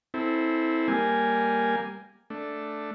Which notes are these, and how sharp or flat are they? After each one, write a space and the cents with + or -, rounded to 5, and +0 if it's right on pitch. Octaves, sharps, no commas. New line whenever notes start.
C4 +0 E4 -20 A4 +0
G3 +0 A#3 -5 G#5 +0
A3 +0 D4 +0